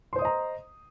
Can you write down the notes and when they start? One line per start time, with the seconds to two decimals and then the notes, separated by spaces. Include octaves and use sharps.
0.13 C6
0.16 C5
0.19 D#6
0.22 D#5
0.25 A#5